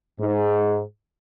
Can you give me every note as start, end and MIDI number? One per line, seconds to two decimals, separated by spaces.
0.20 0.81 44